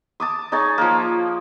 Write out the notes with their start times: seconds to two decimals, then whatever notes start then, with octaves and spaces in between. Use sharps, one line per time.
0.20 A5 D6 D#6
0.52 D#4 G#4 C#5 A5
0.78 F3 A#3